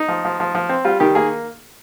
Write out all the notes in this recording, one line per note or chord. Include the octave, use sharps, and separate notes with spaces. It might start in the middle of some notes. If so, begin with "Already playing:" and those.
Already playing: D#4
F3
F3
F3
F3
C4
G3 F4
D#3 G4
A#3 G#4